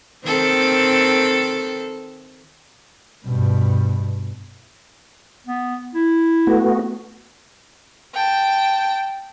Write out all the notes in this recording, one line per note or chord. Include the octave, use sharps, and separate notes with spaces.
D#3 C4 A4
G2 B2
B3
E4
A3 B3 F#4
G5 A5